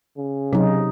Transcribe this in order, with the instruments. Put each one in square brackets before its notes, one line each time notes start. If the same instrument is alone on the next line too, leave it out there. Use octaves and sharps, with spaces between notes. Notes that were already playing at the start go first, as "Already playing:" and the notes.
[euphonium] C#3
[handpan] C3 D#4 [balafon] F#3